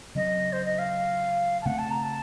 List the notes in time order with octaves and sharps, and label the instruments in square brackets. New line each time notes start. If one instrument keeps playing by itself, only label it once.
[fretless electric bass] C#3 F#3 C4 [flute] D#5
[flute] C5
D#5
F5
A5
[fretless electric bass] C#3 A3 C4 [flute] F#5
[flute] A5
A#5
A5